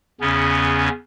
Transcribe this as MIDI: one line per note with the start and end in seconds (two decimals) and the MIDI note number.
0.21 0.89 40
0.21 0.89 49
0.21 0.89 59
0.21 0.89 61